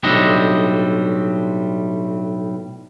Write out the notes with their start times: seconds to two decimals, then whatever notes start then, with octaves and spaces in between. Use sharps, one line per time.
0.03 B1 A2 G3 C4 D4 D#5